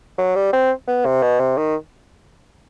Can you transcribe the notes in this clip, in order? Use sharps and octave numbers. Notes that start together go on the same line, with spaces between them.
F#3
G3
C4
B3
C3
B2
C3
D#3